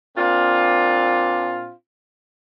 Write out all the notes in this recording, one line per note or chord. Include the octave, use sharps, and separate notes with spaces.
A#2 C4 D4 F4